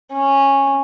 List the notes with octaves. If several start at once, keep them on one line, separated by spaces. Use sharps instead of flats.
C#4